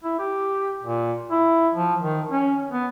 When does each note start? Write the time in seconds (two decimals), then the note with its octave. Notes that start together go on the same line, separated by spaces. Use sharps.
0.04 E4
0.19 G4
0.83 A#2
1.31 E4
1.74 F3
2.01 D#3
2.31 C#4
2.71 B3